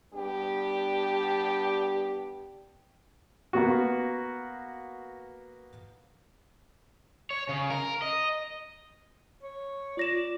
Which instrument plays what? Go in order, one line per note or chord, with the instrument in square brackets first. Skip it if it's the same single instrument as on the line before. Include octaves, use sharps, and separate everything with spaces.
[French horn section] G3 B3 D4 G4
[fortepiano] A#3 B3 F#4
[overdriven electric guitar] C#5
C#3
A#4
D#5
[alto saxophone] C#5
[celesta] F4 A#6 E7 [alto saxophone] D5